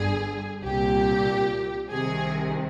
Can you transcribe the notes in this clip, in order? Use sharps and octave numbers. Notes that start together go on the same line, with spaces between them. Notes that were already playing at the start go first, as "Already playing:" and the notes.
Already playing: G1 G2 D3 G#4
C2 A#2 G4
C2 C3 D#3 G#4